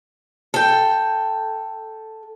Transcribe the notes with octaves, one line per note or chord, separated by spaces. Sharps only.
A4 G5